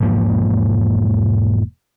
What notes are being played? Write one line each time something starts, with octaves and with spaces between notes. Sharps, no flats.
E1 G#2 F3 A#3